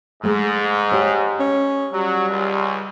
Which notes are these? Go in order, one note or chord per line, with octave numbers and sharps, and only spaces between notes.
G#2 G#3 A3
G4 C#5
C#4
F#3 G3
C#2